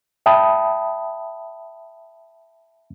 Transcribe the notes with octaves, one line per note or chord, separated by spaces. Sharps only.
E5 G5 A5 B5 D#6